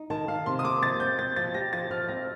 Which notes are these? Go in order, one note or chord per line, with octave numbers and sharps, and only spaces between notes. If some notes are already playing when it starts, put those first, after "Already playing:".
Already playing: D#4
D#3 A5
D#3 F5
C3 C6
D#6
A#3 D6
F3 A6
C4 G6
C4 A6
F3 A6
G4 A#6
F3 A6
F3 F6
C4 A#6